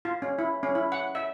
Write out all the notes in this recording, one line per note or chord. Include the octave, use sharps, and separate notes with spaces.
F4
C#4
E4
C#4
E4
F#5
E5